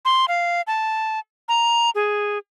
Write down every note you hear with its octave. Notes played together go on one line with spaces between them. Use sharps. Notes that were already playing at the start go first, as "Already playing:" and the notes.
C6
F5
A5
A#5
G#4